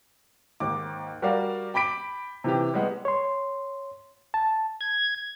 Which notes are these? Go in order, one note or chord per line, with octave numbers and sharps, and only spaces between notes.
D#2 G#2 D6
G3 F#4 A#4 D5 F5
G5 B5 D6 B6 D7
C3 E3 G4
G3 G#3 B3 F#5
C#5 C6
A5
G#6